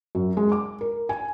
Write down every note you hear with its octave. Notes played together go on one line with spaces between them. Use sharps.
F#2
G#3
D6
A#4
G#5